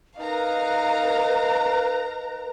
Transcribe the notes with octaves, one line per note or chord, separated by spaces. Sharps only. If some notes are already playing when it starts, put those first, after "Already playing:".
D#4 A#4 B4 F5 A#5